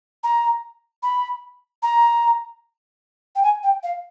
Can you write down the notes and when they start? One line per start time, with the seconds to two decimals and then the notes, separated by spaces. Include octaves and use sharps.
0.24 A#5
1.03 B5
1.83 A#5
3.36 G5
3.43 G#5
3.63 G5
3.83 F5